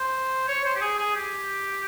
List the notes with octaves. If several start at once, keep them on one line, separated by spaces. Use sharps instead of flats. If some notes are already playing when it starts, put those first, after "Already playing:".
Already playing: C5
C#5
C5
G4
G#4
G#4
G4